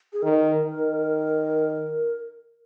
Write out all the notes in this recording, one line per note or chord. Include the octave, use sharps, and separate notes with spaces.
G#4
D#3 A#4
D#3